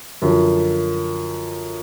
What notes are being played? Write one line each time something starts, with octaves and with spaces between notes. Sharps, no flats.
F#2 D3 F3